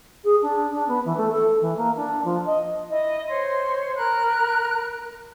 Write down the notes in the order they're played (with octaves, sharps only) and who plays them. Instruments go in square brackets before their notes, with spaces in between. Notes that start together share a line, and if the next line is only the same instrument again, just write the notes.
[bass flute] G#4
D4
D4
B3
E3
A3
A4
E3
A#3
D4
F3
D#5
[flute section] E4 D#5
C5 C#5 C6
A#4 A#5 B5 F#6